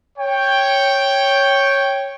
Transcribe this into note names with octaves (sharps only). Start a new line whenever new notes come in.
C#5 G5